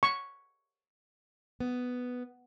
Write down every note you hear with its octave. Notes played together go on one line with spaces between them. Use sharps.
C#6
B3